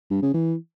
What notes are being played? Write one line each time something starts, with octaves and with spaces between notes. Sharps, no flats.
G2
C#3
E3